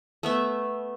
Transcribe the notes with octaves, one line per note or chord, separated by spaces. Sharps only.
A3 B3 E5